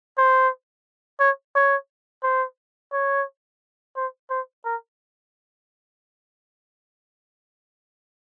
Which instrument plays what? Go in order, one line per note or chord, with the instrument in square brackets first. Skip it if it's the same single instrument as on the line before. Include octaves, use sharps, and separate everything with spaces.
[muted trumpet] C5
C#5
C#5
C5
C#5
C5
C5
A#4